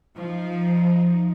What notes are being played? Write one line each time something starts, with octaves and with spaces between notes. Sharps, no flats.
F3 D#4